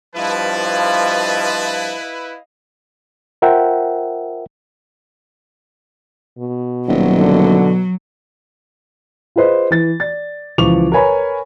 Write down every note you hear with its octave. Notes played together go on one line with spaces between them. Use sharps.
G2 F3 E4 B4 D#5 F5 A5
F4 A#4 C5 E5 F#5 G5
B2
D#1 F#3
D3
F4 G#4 B4 C5 D#5
E3 A6
D5 A6
C#2 E3 F3 C#6 D6 F7
A#4 B4 C#5 G#5 B5